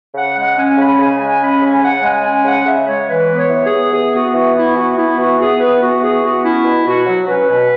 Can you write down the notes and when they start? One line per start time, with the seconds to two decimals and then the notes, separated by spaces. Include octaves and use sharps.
0.14 C#3 F#5
0.35 G#3 F#5
0.56 C#4 G#5
0.77 C#3 B5
0.98 C#3 G#5
1.19 G#3 G#5
1.40 C#4 B5
1.61 C#3 G#5
1.82 C#3 F#5
2.02 G#3 G#5
2.23 C#4 G#5
2.44 C#3 F#5
2.66 C#3 E5
2.86 G#3 C#5
3.08 E3 B4
3.29 B3
3.35 C#5
3.49 E3
3.64 G#4
3.71 B3
3.92 E3 G#4
4.12 B3 F#4
4.33 E3 F#4
4.54 B3 E4
4.75 E3 F#4
4.96 B3 E4
5.17 E3 F#4
5.38 B3 G#4
5.59 E3 B4
5.80 B3 F#4
6.01 E3 G#4
6.21 B3 F#4
6.42 C#4 E4
6.64 B2
6.84 B2 F#4
7.06 F#3
7.27 C#4 B4
7.48 B2